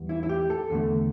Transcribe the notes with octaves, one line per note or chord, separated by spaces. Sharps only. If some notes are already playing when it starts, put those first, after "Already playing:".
Already playing: E2 E3 G3 B3
E4
E4
G4
A4
E2 D3 A3